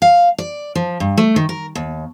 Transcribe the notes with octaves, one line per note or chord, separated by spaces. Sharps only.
F5
D5
F3
G2
A3
D#3
A#4
D#2